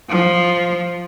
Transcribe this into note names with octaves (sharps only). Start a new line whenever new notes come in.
F3